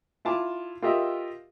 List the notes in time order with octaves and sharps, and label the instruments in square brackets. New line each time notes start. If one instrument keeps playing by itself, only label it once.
[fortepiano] E4 F4 A5 D6
F4 G4 A4 A#4 D#5 E5